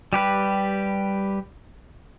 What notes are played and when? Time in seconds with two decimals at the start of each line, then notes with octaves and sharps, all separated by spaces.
0.13 G3 G4 B4